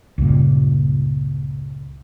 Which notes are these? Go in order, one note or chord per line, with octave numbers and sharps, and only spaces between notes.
C#2 G2 A#2